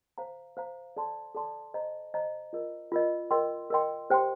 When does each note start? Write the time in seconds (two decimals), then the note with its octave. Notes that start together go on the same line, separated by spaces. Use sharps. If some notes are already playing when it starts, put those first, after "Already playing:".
0.18 C5 F5 A#5
0.57 C5 F5 A#5
0.97 A4 D5 A5 C6
1.35 A4 D5 A5 C6
1.74 C5 D#5 A#5
2.14 C5 D#5 A#5
2.53 F4 A#4 D#5
2.92 F4 A#4 D#5
3.31 A#4 D#5 G5 C6
3.70 A#4 D#5 G5 C6
4.10 G4 C5 G5 C6